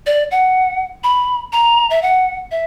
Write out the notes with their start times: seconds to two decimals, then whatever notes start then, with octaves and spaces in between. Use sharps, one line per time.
0.06 D5
0.31 F#5
1.04 B5
1.53 A#5
1.90 E5
2.02 F#5
2.51 E5